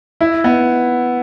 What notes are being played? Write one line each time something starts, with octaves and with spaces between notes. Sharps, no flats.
E4
B3